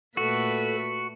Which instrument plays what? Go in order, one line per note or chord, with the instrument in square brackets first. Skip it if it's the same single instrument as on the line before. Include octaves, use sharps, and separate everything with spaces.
[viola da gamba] A#2 A3 B4 [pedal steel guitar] F#4 [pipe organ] A4